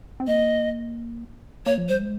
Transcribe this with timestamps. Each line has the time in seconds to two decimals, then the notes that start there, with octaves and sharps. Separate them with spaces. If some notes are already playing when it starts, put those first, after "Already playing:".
0.20 C4
0.27 A#3 D#5
1.66 A#3 C#5
1.78 F3
1.89 G3 C5
2.01 G#3